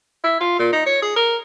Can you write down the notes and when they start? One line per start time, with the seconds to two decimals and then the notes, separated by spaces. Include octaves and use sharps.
0.24 E4
0.40 F4
0.59 A#2
0.73 D#4
0.86 C#5
1.02 G#4
1.16 A#4